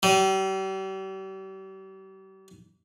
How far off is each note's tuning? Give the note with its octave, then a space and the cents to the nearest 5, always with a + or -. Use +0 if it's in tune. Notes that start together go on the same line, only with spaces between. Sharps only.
G3 -40